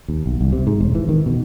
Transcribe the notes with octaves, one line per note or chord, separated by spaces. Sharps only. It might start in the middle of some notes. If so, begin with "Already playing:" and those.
D#2
B1
C2
C3
G#2
E1
E3
D#3
B2